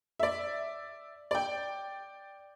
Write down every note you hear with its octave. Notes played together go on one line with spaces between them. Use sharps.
D5 E5
D5 G5